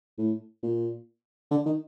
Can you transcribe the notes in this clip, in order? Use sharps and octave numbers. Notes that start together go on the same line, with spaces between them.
A2
A#2
D3
D#3